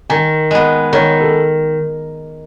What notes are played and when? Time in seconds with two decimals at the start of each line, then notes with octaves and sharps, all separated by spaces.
0.10 D#3 G#5
0.51 G#3 B3 D#5
0.92 D#3 C#5
1.20 A4